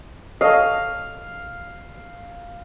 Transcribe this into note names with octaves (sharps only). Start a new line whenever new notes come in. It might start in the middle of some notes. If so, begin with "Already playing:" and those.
A4 C#5 D#5 F5